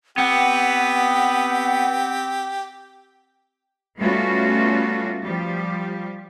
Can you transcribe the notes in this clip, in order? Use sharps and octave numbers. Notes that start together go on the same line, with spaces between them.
B3 C4 G4 F#5
G3 A3 B3 C#4 F4 F#4
F3 G3 G4